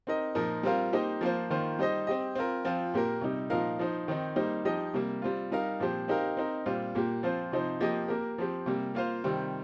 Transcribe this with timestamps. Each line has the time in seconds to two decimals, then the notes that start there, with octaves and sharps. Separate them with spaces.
0.07 C4 D#4 A#4 D#5
0.35 A#2 F3 D#4 A#4
0.63 G3 C4 F4 A#4 F5
0.93 A#3 D#4 G4 C5 D#5
1.21 F3 A#3 F4 C5
1.50 D#3 A#3 F4 C5
1.79 G3 D#4 C5 D#5
2.07 C4 G4 D#5
2.35 C4 F4 A#4
2.65 F3 C4 F4
2.94 A#2 A#3 G4 A#4
3.21 C3 G3 D#4
3.50 A#2 F3 D#4 A#4 F5
3.79 F3 D#4 C5
4.08 D#3 C4 D#4
4.36 G3 A#3 D#4 C5
4.65 F3 D#4 G4 D#5
4.94 C3 G3 A#3
5.22 G3 C4 F4
5.51 G3 D#4 A#4 F5
5.80 A#2 F3 C4 G4 C5
6.08 C4 D#4 G4 A#4 F5
6.37 C4 D#4 A#4
6.66 A#2 G3 C4 F4
6.95 A#2 A#3 G4
7.23 F3 C4 F4 C5
7.52 C3 F3 D#4 C5
7.80 F3 A#3 G4 D#5
8.08 A#3 G4 A#4
8.38 F3 C4 G4
8.66 C3 G3 A#3
8.95 A#3 F4 C5 F5
9.24 C3 D#3 G3 C4